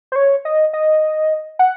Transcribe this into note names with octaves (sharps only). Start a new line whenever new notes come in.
C5
C#5
D#5
D#5
F#5